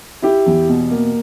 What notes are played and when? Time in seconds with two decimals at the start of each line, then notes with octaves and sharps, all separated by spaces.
0.22 E4 G4
0.46 E2
0.69 B2
0.91 A#3